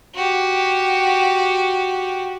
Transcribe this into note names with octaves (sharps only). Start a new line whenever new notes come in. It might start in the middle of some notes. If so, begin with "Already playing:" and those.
F#4 G4